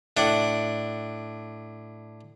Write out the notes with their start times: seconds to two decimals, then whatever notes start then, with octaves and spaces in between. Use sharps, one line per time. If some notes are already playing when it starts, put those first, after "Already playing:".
0.17 A2 D4 F#5